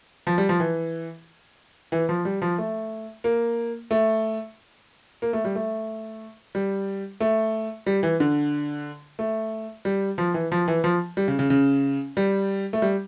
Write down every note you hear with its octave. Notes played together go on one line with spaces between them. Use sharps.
F3
G3
F3
E3
E3
F3
G3
F3
A3
A#3
A3
A#3
A3
G3
A3
G3
A3
G3
E3
D3
A3
G3
F3
E3
F3
E3
F3
G3
C#3
C#3
C#3
G3
A3
G3